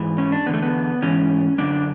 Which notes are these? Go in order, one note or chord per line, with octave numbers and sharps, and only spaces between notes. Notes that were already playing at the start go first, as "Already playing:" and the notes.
Already playing: G#2 E3
C#4
D4
E2 D3 B3
A3
B3
G#2 E3 C#4
F#2 D3 D4